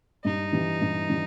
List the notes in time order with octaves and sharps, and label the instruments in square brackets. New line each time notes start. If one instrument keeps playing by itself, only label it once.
[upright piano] G2 [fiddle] D#4
[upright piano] E3 G3
G2
E3 G3